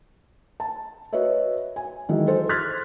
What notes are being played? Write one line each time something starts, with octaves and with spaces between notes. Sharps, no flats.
A5
F#4 B4 C#5 D#5 E5
G#5
D#3 E3 F#3 G#3 E4
A4 C5
C6 F6 F#6 G#6 A6 B6